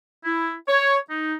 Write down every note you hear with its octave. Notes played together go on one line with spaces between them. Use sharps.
E4
C#5
D#4